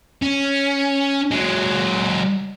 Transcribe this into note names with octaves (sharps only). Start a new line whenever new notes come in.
C#4
F#3 G#3